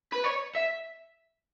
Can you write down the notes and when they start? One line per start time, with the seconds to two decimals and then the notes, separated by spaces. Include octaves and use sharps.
0.12 B4
0.24 C#5
0.55 E5